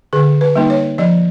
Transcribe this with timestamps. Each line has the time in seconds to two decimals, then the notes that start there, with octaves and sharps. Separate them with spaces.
0.13 D3 G#4
0.41 B4
0.56 G3 A#3 D#4
0.70 C#5
0.98 F3 D5